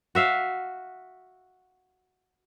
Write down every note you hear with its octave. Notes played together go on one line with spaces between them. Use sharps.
F#4 E5 F5